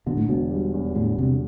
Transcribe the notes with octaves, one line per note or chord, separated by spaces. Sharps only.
B2 D3
A2
E1 B2
G3
E2
A2 D3
E1 C3